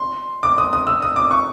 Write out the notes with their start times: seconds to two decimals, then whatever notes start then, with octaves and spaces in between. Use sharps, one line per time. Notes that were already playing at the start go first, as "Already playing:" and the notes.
Already playing: C6
0.43 D6
0.58 D#6
0.73 D#6
0.87 E6
1.02 D#6
1.16 D6
1.31 C#6